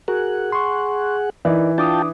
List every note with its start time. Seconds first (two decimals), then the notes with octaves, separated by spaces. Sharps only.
0.08 F#4 G#4 A#4 F#5
0.52 C6 C#6
1.45 E3 D#4 A#4 D5
1.78 D4 F4 G5 A5 D6 D#6